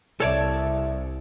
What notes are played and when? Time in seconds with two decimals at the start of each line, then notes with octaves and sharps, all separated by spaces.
0.20 C2 A4 C#5 D5 E5 A5